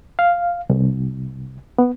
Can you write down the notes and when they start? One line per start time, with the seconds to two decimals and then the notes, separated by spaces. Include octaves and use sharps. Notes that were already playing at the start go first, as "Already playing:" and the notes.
0.19 F5
0.70 C2
1.79 B3